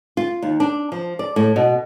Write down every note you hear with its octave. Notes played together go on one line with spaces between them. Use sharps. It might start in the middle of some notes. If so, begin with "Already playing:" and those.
F4
D#2
D4
F3
D5
A2
B2